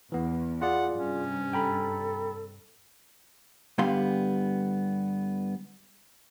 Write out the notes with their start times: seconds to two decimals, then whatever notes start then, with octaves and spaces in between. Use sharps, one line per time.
0.12 E2 E3 B3
0.62 F4 G#4 D5 F#5
0.98 G2 C3 C#4
1.53 A4 G5 A#5 B5
3.78 G2 D3 G3 B3 F5 C6